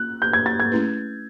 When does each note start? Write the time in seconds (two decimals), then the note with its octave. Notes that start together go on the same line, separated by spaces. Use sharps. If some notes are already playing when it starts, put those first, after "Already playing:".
Already playing: A#3 C#4 F4 F#6
0.22 G6
0.33 G#6
0.46 A6
0.60 G#6
0.72 A3 C#4 E4 G#4 B4